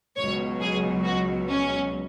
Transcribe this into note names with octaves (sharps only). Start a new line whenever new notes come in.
C#2 B2 F#3 C#5
G#4
F#4
C#4